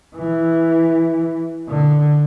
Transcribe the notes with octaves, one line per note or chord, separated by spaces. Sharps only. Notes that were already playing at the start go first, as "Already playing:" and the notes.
E3
D3